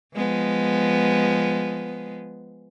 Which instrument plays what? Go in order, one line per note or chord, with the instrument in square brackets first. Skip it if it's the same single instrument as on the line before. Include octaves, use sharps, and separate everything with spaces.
[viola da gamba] F3 G#3 B3